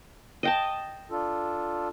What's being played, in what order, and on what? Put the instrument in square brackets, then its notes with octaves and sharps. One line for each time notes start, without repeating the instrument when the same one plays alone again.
[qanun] D#5 G5 A5
[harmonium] D4 F4 A4